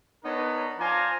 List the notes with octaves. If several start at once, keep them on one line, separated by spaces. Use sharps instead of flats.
B3 D4 D#4 A#4 B4 C#5
F3 C5 D5 F5 G#5 A#5